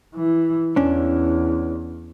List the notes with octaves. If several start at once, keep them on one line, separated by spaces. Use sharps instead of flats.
E3
E2 C#4 D4